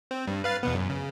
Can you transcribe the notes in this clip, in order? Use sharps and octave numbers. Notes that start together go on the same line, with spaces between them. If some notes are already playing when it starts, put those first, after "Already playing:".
C4
G2
B4 F5 A6
E2 B2 B3
F#2
C#3